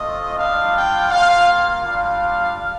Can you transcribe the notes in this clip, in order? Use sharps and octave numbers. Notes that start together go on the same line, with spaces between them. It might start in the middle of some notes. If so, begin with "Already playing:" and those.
Already playing: A3 C4 F4 D#5
G3 D4 F4 F5
G5
A#3 F4 F5
G3 D4 F4 F5